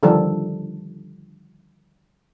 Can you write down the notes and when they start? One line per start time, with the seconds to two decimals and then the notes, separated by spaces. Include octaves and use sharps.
0.03 D3 D#3 F3 G3 A4